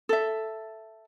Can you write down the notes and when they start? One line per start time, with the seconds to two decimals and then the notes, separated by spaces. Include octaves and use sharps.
0.09 A4 E5